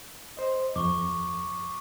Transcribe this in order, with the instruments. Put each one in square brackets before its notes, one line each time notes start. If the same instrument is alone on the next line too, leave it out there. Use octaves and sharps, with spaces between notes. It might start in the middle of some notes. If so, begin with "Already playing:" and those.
[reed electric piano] C5 D#5
[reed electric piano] F2 [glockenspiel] C#6 D6